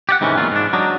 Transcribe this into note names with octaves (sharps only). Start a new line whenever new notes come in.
G4 D5 F#5
G#2 C3 D#3 E3 C#4
E2 A#2 F#3 F4
G#2 D4
F#3 D4 D#4